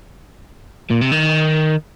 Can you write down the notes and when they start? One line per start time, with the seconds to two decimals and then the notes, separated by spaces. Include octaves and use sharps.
0.90 A#2
1.01 C3
1.12 D#3